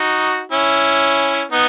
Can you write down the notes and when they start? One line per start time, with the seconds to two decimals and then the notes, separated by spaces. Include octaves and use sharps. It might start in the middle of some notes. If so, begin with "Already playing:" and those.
Already playing: D#4 F#4
0.52 C#4 E4
1.52 B3 D#4